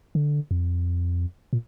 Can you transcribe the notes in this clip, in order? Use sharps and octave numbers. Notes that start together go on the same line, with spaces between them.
D3
F2
A#2